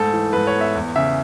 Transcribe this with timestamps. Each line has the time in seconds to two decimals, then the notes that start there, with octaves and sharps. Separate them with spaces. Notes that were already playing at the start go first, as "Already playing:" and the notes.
Already playing: G#2 A3 A4
0.13 E3
0.33 G#2 B4
0.47 C#5
0.54 B3
0.61 E5
0.75 E2
0.96 C#3 E5